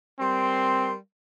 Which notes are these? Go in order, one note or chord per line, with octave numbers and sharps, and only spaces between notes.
G3 C4 A#4 C6